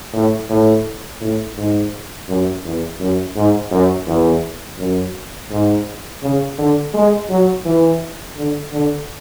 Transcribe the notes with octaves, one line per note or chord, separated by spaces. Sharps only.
A2
A2
A2
G#2
F#2
E2
F#2
G#2
F#2
E2
F#2
G#2
C#3
D3
G#3
F#3
E3
D3
D3